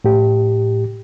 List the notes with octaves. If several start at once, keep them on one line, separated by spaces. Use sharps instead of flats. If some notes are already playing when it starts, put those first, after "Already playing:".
A2 G4